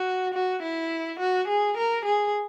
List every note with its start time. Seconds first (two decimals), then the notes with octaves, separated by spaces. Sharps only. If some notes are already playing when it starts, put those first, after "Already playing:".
Already playing: F#4
0.34 F#4
0.63 E4
1.20 F#4
1.48 G#4
1.77 A#4
2.05 G#4